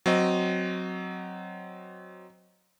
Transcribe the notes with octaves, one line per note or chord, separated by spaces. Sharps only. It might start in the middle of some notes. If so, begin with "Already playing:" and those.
F#3 C4 D#5